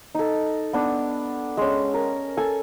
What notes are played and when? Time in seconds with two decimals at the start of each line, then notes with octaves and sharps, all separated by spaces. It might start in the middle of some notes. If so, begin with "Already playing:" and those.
0.15 D#4 A4
0.73 B3 D4
1.57 G#3 C#4
1.94 A#4
2.37 A4 G#5